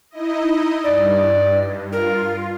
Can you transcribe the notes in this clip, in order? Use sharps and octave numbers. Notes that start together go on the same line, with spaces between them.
D#4 E4 D#5
G2 D5
F4 A#4